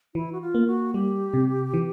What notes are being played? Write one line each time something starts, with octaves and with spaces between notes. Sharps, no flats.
E3 E4
F#4
F4
A#3
F#4
G3 G4
C3
E3